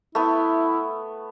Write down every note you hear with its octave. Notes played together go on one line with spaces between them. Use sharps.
A3 B3 E4